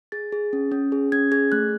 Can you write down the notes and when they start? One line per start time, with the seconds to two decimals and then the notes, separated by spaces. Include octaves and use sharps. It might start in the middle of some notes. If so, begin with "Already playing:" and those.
0.12 G#4 A6
0.32 G#4
0.53 C#4
0.72 C#4
0.92 G#4
1.12 C#4 G#6
1.32 G#4 G#6
1.52 A3 F#6